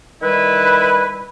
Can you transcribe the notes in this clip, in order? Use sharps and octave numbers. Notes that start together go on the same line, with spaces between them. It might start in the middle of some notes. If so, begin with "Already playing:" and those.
D#3 G3 E4 B4